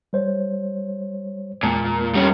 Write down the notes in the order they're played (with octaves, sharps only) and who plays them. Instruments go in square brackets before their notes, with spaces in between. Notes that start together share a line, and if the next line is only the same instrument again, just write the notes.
[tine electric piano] G3 C5 C#5
[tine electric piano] E2 G#3 A5 [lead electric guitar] A#2
[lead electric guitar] G3 C#4